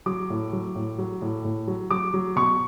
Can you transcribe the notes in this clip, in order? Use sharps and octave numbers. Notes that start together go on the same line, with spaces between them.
F#3 D6
A2
F#3
A2
F#3
A2
A2
F#3
F#3 D6
F#3
B2 C#6